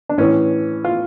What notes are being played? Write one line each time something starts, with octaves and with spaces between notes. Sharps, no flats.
D4
A2 E3 C#4
F4